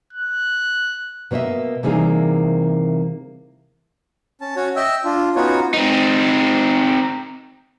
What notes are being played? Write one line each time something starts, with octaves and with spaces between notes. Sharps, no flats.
F#6
B2 A#3 C#5 D#5 E5
C3 E3 G3 A#3 D#4 G#4
C#4 A5
C#4 F#4 C#5
D#5 E5 G5 E6
D4 F4
B3 C#4 D#4 F4 F#4 C#5
C4 D#4